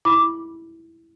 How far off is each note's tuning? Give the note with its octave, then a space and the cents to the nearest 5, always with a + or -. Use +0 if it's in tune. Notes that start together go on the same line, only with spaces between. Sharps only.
E4 +0 B5 -15 D6 +0